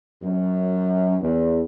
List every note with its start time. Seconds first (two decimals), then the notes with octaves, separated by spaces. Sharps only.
0.23 F#2
1.21 E2